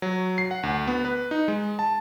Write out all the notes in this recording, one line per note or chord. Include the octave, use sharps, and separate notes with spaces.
F#3
C7
F#5
D2
B3
B4
D#4
G#3
A5